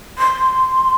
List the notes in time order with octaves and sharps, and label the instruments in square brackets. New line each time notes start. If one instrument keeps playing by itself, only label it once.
[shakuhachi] C6